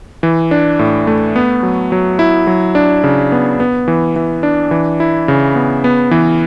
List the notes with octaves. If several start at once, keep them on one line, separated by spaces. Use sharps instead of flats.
E3
D4
A2
A3
B3
F#3
F#3
E4
F#3
D4
C#3
B3
B3
E3
E3
D4
E3
E4
C#3
B3
B3
E3